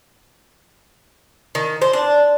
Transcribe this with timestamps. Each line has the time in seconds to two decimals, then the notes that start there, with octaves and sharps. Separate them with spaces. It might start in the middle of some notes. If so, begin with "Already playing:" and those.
1.55 D#3
1.82 C5
1.93 D4